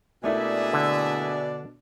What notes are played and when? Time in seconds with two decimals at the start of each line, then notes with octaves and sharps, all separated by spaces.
0.24 B2 A3 A#3 D4 E4 G#4 D5 E5
0.73 D3